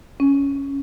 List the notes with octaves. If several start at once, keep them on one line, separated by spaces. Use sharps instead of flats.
C#4